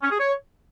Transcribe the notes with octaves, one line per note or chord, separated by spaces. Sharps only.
C#4
G#4
C#5